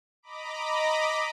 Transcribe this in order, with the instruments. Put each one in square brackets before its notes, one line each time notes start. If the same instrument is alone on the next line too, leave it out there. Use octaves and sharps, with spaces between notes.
[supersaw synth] D#5 A#5 B5 D6